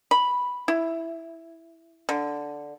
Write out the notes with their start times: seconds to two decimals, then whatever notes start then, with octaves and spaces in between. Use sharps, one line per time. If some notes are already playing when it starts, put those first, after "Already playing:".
0.11 B5
0.68 E4
2.09 D3